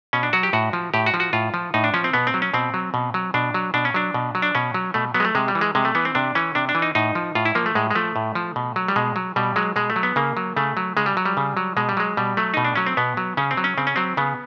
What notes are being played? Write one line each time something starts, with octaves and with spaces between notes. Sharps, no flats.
B2 C#4
D4
F#3 F#4
G4
A2 F#4
F3
A2 G4
F#4
F3
F#4
A2 F4
F3
A2 D#4
D4
F3 C#4
C4
B2 B3
C4
F#3
C#4
B2 C4
F#3
B2
F#3
B2 D4
F#3
B2 D4
C#4
F#3 D4
B2
F#3
D4
B2 C#4
F#3
B2 A3
F#3 B3
G#3
A3
C3 G#3
G3
E3
G#3
C3 G#3
A3
E3 B3
C4
C3 D4
E3 C#4
C3 D4
D4
E3
D#4
A2 D#4
F3
A2 F4
E4
F3 A#3
A3
A2 G#3
G#3
F3 A3
A2
F3
B2
F#3
G3
B2 G#3
F#3
B2 G3
F#3 G#3
B2 G#3
A3
F#3
B3
C#3 A#3
F#3
C#3 A3
F#3
C#3 G#3
G3
F#3
G3
C#3
F#3
B2 G#3
G3
F#3 G#3
B2 G3
F#3 A3
B2 D#4
D4
F#3 C#4
C4
B2 B3
F#3
C#3 C#4
C4
F#3
C#4
C#3 C4
C#4
F#3 C4
C#3 B3